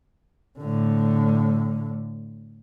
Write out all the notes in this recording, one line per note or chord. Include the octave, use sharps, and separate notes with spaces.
A2 D3